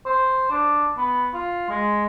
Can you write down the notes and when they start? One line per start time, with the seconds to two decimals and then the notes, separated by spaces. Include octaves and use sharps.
0.06 C5
0.51 D4
0.97 B3
1.34 F4
1.69 G#3